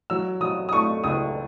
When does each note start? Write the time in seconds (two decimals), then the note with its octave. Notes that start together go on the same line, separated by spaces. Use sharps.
0.10 F#3 E6
0.41 F#3 D#6
0.69 D#6
0.73 A3 C#6
1.04 C#2 D#6